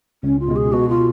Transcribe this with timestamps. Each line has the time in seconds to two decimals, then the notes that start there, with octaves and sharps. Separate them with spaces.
0.23 C#2 C#4
0.40 F4
0.48 B2 G#3
0.56 G#4
0.73 B2 F#4
0.89 F4